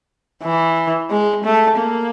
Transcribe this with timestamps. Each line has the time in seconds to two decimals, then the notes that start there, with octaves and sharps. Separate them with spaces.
0.43 E3
1.10 G#3
1.44 A3
1.78 A#3